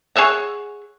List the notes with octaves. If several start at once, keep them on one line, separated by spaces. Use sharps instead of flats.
G#4 C#5 E5 F#5